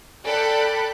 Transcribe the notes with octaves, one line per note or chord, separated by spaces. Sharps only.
A4 D5 G5 B5 F#6